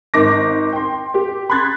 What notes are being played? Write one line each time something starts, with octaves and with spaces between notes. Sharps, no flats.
G#1 G#2 D#3 D#4 D6 A#6
G5 C6
G4
B5 C6 F#6 G#6 A6